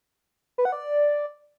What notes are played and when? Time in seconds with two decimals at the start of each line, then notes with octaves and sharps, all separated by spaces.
0.58 B4
0.65 F#5
0.72 D5